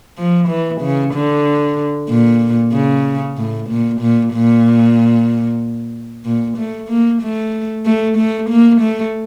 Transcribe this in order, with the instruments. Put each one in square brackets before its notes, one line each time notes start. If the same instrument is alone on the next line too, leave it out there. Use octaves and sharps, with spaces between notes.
[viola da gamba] F3
E3
C#3
D3
A#2
C#3
A2
A#2
A#2
A#2
A#2
A3
A#3
A3
A3
A3
A#3
A3